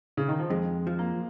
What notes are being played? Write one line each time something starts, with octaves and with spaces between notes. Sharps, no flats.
C#3
D#3
F3
F2 G#3
F3
A#3